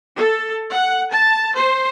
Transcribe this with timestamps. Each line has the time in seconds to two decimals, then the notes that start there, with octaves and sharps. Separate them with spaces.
0.15 A4
0.69 F#5
1.09 A5
1.53 C5